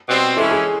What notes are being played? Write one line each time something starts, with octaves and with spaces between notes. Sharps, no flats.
B2 G3 C4
E3 G#3 C#4 E4 A4
G#4